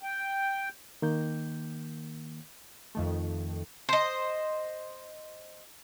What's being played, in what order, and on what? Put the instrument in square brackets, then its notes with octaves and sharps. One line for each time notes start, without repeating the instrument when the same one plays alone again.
[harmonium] G5
[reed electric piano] D#3 A#3 G6
[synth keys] F2 D#3 A3
[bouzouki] C5 D#5